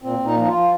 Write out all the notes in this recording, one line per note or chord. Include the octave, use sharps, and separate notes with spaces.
A#2 C4
A#2
D#4
F3 D#4
F4
F3